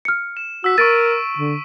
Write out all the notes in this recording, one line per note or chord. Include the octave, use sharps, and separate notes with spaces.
F6 C#7
E7
F#4 E6 B6
A#4 C#6 A6 D7 D#7
D3